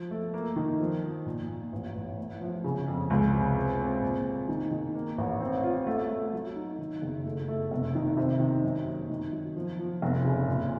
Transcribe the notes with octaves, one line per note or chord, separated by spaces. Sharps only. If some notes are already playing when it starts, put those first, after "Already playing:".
Already playing: F3
A3
A#3
D#3
F3
F3
A#2
A#2
A1
A1
A2
F3
C#3
F2
C#2
C3
C4
C4
A#2
A#3
D#3
D#3
A#3
A1
C4
F4
A3
A3
F#3
D#4
D#3
F#1
A3
A3
F1
D#3
C3
D#3
F#2
A#3
D#3
F#3
F3
F3
F1
C#3
A#2